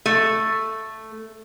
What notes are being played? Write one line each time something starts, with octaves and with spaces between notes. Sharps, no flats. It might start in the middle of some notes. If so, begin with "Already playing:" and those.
A3